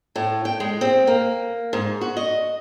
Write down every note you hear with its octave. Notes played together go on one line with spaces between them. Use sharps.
A2
G5
G#3
C4
A#3
G#2
F#4
D#5